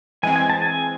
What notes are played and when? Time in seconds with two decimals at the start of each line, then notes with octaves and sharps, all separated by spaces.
0.23 E3 G#3 C4 G#5
0.36 G#5
0.50 A5
0.62 G#5